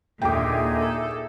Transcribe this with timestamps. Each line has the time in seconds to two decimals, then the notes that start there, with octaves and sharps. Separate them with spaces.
0.22 D#2 A#2 D3 D#4 G#4 E5 G5 D6
0.80 A4